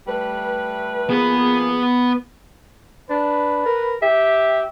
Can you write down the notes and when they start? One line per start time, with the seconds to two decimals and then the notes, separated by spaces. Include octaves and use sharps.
0.07 G3 A3 B4
1.10 F3 A#3 B3 G#4 B4
3.10 D4 B4
3.66 A#4
4.02 G4 E5